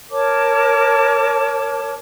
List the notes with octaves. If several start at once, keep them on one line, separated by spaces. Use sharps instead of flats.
A#4 C#5 A5 D6